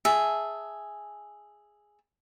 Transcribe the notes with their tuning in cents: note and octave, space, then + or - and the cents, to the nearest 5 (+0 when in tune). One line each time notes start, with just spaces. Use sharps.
G#4 +0 E5 -5 A5 +0